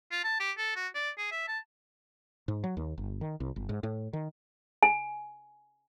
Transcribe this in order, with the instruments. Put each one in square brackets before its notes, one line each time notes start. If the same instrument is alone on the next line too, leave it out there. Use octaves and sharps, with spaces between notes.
[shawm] F4
A5
G4
A4
F#4
D5
G#4
E5
A5
[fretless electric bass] G#2
F#3
D#2
G1
D#3
C2
G1
G#2
A2
D#3
[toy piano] G#5